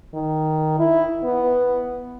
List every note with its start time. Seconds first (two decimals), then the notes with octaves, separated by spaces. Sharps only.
0.14 D#3
0.79 E4
1.23 B3